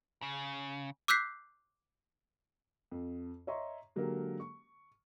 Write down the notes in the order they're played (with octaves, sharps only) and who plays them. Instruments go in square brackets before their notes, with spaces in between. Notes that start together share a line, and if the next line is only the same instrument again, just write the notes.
[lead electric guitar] C#3
[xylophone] D6 E6 F#6 G6 B6 C7
[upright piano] F2
C#5 D#5 E5 A#5 C6 C#6
D3 F#3 G#3 A#3 G4 A#4
C#6